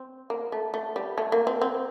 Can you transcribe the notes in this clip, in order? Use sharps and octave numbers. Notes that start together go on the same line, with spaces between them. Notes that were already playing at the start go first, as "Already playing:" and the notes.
Already playing: C4
A#3
A3
A3
G3
A3
A#3
C4
C4